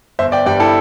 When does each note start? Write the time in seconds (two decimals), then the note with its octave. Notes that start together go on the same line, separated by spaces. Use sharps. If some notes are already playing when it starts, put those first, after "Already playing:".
0.19 G1 C5 E5
0.32 D5 G5
0.46 G2 G3 D5 G5
0.60 E4 A4